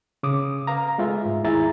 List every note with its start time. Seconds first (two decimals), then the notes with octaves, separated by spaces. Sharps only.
0.23 C#3 D6 D#6
0.67 B4 F5 A#5
0.98 G#3 A3 F4 E5
1.25 G#2
1.44 D#2 E4 G#4 E5 A#5 A6